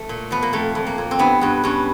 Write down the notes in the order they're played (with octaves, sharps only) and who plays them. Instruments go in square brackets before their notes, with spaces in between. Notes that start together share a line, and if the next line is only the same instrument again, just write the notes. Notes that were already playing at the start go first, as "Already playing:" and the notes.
Already playing: [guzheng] A3
A#2
F3 B3
A#3
F2 A3
F2
A#3
F2
C4
G2 B3
G2 B3
G2 C#4